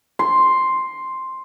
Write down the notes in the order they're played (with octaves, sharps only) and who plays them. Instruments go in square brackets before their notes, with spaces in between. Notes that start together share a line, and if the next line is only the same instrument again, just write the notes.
[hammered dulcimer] C6